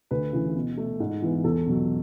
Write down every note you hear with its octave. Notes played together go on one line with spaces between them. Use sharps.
D2 B4
C#3 E3
B2
A3
G#2
E3 B3
E2 A4
B2 F#3